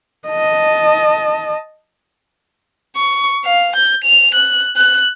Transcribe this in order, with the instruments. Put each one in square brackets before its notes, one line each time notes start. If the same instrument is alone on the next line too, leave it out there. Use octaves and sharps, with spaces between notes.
[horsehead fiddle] D#5 A5
[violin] C#6
F5
G6
F7
F#6
F#6